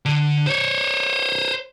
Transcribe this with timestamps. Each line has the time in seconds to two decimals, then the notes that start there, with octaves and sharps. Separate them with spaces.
0.05 D3
0.47 C5 C#5